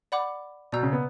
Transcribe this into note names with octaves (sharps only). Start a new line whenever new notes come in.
D5 F#5 B5 D6
B2 D5 A#5 E6 G6
C#3
B3